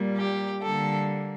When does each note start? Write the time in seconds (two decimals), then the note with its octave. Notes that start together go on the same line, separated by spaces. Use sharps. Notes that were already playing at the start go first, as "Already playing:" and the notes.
Already playing: A#2 G3 A#3
0.16 G4
0.62 D3 G3 A#3 A4